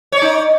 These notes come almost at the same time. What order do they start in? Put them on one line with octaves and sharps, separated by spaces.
C#5 D5 D#4